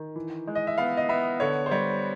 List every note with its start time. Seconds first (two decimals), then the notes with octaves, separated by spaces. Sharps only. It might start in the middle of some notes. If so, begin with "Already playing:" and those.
Already playing: D#3
0.16 E3
0.48 G#3
0.55 D#5
0.67 E5
0.78 B3 F5
0.97 D#5
1.09 B3 E5
1.40 D3 C#5
1.66 C5
1.71 G3 C#5